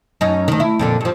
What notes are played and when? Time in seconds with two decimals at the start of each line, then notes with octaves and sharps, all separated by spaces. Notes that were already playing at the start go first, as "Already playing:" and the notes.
0.21 F#2 C#4 D#4
0.48 D2 D#3
0.60 E4
0.79 F2 A#2 D3
1.01 G2 F3